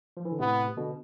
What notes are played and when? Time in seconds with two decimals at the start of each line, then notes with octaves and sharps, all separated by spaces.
0.17 F3
0.25 E3
0.32 D3
0.39 A2 C3 B3
0.77 B2 D3